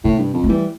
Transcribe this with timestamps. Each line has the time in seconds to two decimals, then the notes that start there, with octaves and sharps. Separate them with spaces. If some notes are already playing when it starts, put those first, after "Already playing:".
0.04 A2 C3
0.19 G2
0.33 F2
0.44 A3
0.49 E3 G3